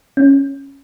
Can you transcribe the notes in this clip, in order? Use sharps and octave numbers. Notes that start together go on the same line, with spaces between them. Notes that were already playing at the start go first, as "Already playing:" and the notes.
C#4